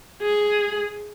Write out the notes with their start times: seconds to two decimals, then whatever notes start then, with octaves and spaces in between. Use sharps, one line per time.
0.22 G#4